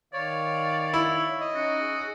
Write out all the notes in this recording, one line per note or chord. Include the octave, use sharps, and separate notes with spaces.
D#3 C#5 D5 F5
E4
D#5
C#4 D#4 F#4
G#4